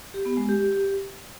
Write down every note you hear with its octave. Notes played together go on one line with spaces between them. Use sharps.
G4
B3
G#3
G4